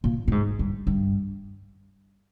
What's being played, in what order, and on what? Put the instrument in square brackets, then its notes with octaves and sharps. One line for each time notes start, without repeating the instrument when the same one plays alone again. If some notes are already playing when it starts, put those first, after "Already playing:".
[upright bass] A#2
A#2
G#2
G2
G2